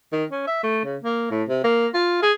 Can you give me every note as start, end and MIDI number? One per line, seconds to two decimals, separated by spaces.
0.12 0.24 51
0.32 0.45 61
0.47 0.62 76
0.63 0.80 57
0.84 0.97 49
1.03 1.28 58
1.31 1.43 45
1.48 1.62 48
1.64 1.87 58
1.94 2.20 65
2.22 2.32 68